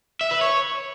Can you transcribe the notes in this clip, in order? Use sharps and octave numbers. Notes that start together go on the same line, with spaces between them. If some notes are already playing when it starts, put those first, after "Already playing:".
E5
B4
C#5